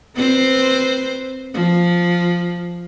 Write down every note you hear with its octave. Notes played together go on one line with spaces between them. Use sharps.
C4 B4 C5
F3